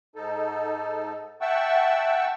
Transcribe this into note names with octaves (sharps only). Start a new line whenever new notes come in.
G#2 D#4 A4
E5 F#5 G5 A5 C#6 E6